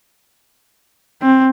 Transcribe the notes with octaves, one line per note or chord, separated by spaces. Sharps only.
C4